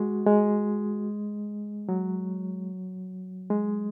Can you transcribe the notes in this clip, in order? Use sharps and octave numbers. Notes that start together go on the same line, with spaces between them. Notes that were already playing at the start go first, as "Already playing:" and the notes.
Already playing: G#3 F#4
G#3
F#3
G#3